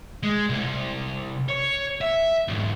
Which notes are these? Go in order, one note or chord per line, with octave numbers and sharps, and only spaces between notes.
G#3
C2
C#5
E5
E2 G#2